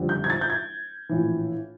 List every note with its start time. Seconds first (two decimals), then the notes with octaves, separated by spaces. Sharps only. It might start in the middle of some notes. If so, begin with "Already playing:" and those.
Already playing: F#1 F2 D3 G3
0.09 G6
0.24 G#6
0.30 A6
0.41 G6
0.50 G#6
1.09 A#1 A2 E3